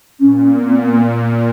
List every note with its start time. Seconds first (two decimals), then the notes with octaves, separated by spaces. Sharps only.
0.20 A#2 C#4
0.56 B3
0.65 C4
0.75 B3
0.92 A#3